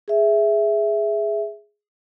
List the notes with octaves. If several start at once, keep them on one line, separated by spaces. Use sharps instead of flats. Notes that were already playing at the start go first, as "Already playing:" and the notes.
G#4 E5